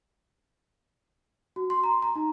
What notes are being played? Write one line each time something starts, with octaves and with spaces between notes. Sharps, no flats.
F#4
C6
A#5
A#5
D#4